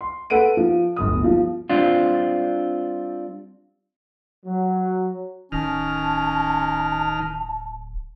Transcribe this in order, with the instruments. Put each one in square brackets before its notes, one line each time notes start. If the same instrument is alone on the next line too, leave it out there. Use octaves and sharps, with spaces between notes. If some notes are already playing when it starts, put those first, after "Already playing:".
[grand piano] C6
A4 B4 F#5 D7 D#7
F3
D1 G1 D#6
F3
[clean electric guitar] G3 C4 D4 F4
[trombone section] F#3
[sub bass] D1 [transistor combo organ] D#3 F6 [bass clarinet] C#4 [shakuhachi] A5